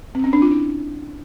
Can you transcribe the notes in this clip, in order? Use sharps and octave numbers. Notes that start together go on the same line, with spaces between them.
C4
C#4
D4
F4
E4